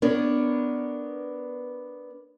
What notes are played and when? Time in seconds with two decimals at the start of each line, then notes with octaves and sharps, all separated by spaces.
0.02 B3 D4 A#4 C#5